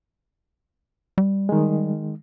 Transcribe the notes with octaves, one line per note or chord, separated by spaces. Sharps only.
G3
D#3 G#3